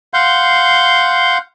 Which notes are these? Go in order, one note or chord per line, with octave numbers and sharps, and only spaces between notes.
F5 F#5 C6 G6